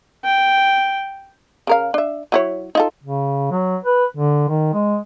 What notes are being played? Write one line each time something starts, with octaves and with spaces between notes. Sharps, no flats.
G5
C#3 A#4 F5
D4 E5
F#3 E4 C#5
D#4 F4 A4
C#3
F#3
B4
D3
D#3
G#3